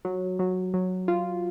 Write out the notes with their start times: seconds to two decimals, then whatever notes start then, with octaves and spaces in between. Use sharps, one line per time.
0.05 F#3
0.39 F#3
0.74 F#3
1.08 F4